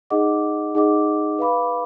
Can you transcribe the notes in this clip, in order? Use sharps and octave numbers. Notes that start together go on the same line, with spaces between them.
D#4 G#4 D#5 F#5 D6
D#4 G#4 D#5 F#5 D6
B4 F5 B5 D6